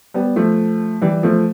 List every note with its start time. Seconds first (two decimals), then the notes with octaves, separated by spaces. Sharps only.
0.14 G3 B3
0.36 F3 A3
1.02 E3 G3
1.23 F3 A3